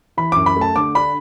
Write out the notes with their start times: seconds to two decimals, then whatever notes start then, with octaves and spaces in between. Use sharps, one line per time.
0.17 E3 B5
0.32 F#2 D6
0.46 B5
0.56 A3
0.61 A5
0.76 D3 D6
0.95 D4 B5